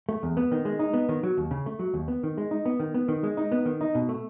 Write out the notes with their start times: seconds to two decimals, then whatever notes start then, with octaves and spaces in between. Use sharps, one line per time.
0.09 A3
0.23 E2
0.37 B3
0.52 D#3
0.65 G#3
0.79 D#4
0.93 B3
1.09 D#3
1.23 F#3
1.38 D#2
1.51 C#3
1.66 A3
1.79 F#3
1.94 D#2
2.08 B3
2.23 D#3
2.38 G#3
2.51 D#4
2.66 B3
2.80 D#3
2.94 B3
3.08 D#3
3.23 G#3
3.37 D#4
3.52 B3
3.65 D#3
3.81 D#4
3.95 B2
4.09 A3